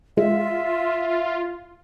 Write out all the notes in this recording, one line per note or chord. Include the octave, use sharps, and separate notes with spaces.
G#3 F4 E5